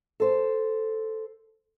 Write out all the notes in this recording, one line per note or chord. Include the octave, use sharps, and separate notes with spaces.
A4 C5